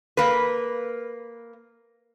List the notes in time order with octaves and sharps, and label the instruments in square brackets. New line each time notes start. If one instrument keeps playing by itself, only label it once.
[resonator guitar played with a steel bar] A#3 B4